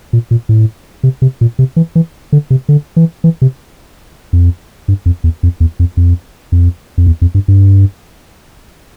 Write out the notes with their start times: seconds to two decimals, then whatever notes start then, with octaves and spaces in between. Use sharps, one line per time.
0.13 A#2
0.31 A#2
0.49 A2
1.03 C3
1.22 C3
1.41 A#2
1.59 C3
1.76 E3
1.95 E3
2.32 D3
2.50 C3
2.69 D3
2.96 E3
3.24 E3
3.42 C3
4.33 F2
4.88 G2
5.06 F2
5.24 E2
5.43 F2
5.60 E2
5.79 F2
5.97 F2
6.52 F2
6.98 F2
7.07 E2
7.22 F2
7.35 G2
7.48 G2